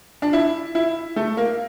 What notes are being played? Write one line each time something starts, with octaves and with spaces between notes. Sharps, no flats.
D4
E4
E4
A3
A#3